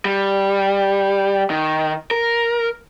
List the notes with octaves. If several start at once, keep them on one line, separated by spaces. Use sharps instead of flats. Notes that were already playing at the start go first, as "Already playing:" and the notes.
G3
D#3
A#4